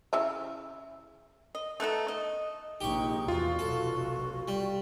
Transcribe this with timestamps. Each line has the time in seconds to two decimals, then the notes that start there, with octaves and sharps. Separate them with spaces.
0.13 C#3 E4 E5
1.55 D#5
1.80 A3 B3 D#4 A4
2.08 D#5
2.81 A#1 C3 G#3 D#4 G4 C#6
3.28 E2 F4 F#4
3.59 F1 B1 A4
4.48 G3